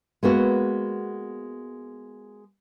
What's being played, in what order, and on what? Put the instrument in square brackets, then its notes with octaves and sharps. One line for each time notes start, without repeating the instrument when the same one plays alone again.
[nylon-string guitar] G#3 A#3 B3 F#4